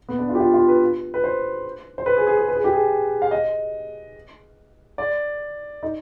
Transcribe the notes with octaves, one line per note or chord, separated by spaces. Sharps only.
B3
D4
F4
G4
F4
F4
B4
B4
C5
C5
B4
G#4
G#4
G#4
B4
G#4
G4
G#4
F5
D#5
D5
D#4